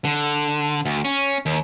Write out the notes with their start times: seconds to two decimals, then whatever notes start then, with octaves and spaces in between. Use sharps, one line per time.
0.05 D3
0.86 D2
1.05 C#4
1.46 D#2